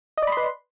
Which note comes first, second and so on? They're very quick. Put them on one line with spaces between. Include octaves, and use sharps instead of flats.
D#5 D5 B5 C6 B4